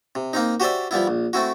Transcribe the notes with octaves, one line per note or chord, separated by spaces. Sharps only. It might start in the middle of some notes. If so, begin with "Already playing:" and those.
C3
A#3 C4 D#4
F#4 G4 C5 D5 E5
F3 G3 B3 E4
A#1
A3 C4 E4 F#4